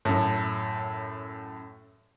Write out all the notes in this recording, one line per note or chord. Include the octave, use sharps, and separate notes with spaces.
F#2 A2